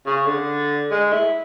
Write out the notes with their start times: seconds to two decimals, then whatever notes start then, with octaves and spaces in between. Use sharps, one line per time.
0.06 C#3
0.26 D3
0.91 G#3
1.13 E4